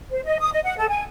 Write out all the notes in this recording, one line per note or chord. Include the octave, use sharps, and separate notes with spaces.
C5
D#5
D#6
D#5
F#5
A4
G#5